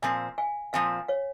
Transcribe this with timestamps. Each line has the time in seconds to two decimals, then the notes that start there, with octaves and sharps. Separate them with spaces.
0.02 A#2 F3 C4 F5 G#5
0.38 F5 G#5
0.73 A#2 F3 C4 F5 G#5
1.08 C#5 F5